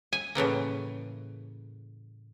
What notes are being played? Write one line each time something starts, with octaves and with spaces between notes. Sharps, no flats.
G#5
A2 C#3 E3 A#3